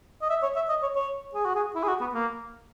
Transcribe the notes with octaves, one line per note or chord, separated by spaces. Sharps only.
D#5
E5
C#5
E5
D#5
C#5
C#5
G#4
F#4
G#4
E4
G#4
F#4
B3
A#3